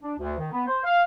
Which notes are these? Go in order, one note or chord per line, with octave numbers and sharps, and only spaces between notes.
D4
D2
D#3
B3
C5
F5